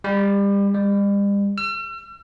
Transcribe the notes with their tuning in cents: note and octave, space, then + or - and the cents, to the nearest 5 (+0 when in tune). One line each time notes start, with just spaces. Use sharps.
G3 +30
G3 +40
E6 +45